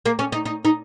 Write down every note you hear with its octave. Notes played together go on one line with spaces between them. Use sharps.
A#3
C#4
D#4
D#4
D#4